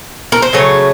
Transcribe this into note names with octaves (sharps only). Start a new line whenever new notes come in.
A#4
C5
C#3 F#3 A3 C#5